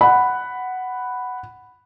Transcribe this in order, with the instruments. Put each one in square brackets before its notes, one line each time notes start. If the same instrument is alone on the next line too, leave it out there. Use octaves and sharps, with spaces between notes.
[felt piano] F#5 B5